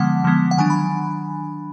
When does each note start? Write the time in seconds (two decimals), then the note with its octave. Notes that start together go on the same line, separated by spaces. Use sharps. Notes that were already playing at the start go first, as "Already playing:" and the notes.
Already playing: D3 F3 G#3 B3 F#5
0.24 D3 F3 G#3 B3
0.51 F#5
0.58 D#3 F#3 D4 G#5
0.70 B5